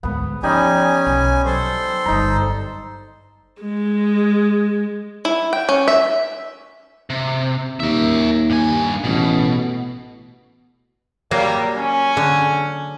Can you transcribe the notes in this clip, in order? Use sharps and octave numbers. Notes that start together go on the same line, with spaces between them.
D2 G#2 B3 B4
F3 G3 C#4 D#4 G#5 B5
B1
F#3 A4 C5
G1 F#2 D#4 A#5
G#3
E4
G5
C#4
E5
C3
D#2 A#4 E5
G2 G#5
A1 B2
F#3 G3 A#3
C#4
D3